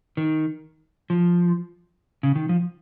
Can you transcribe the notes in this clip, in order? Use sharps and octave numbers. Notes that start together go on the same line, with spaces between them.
D#3
F3
C#3
D#3
F3